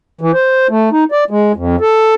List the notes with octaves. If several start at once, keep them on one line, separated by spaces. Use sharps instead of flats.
E3
C5
A3
D#4
D5
G#3
F2
A4